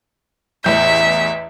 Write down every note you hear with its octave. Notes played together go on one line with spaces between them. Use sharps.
A1 E2 E5 G6